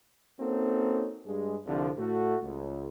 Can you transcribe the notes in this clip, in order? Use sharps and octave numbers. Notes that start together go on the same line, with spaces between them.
A#3 C4 C#4 D#4 F#4 A4
G2 G#3
C2 D3 F3
A2 A3 F#4
C#2